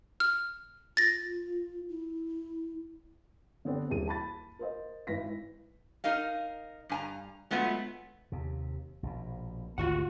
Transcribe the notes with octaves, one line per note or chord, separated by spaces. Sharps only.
F6
F4 A6 A#6
E4
D3 B3 C4 D4
D#1 E3 G#4 D#7
A5 B5 A6
A#4 C5 D#5
G#1 E4 B4 A#6 B6
D#4 A#4 D#5 F5
G2 G#5 A#5
F#3 G#3 A3 B3 F4 E5
D#2 C3
A#1 B2
G#1 D2 F4 F#4 F#5